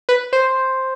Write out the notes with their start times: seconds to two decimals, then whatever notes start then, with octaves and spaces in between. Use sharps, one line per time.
0.09 B4
0.33 C5